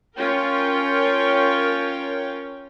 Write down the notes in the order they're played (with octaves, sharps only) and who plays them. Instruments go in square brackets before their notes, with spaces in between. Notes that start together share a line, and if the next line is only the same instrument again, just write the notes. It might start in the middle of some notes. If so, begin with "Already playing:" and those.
[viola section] C#4 F4 A#4 C#5 G5